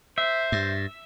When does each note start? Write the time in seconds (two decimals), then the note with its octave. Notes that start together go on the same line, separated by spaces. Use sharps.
0.18 C5 E5
0.52 G2